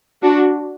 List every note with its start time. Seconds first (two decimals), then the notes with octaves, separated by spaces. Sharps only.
0.22 D4 F#4